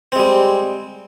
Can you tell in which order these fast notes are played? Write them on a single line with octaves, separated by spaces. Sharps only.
C4 G#3 G3